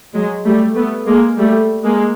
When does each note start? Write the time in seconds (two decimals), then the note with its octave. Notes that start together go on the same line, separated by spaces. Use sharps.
0.14 F#3 G#3
0.45 G3 A3
0.76 A3 B3
1.06 G#3 A#3
1.38 G3 A3
1.84 G#3 A#3